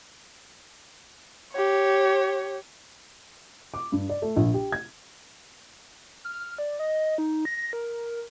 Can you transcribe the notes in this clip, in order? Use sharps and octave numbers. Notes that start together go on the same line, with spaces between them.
G4 C#5
D6
G2
D5
A3
A#1
G4
G#6
F6
D5
D#5
D#4
A#6
A#4